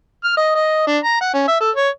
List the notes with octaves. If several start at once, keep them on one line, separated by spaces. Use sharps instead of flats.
F6
D#5
D#5
D4
A#5
F#5
C#4
E5
A4
C#5